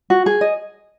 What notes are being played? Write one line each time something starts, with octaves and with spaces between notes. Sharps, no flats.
F#4
G#4
D#5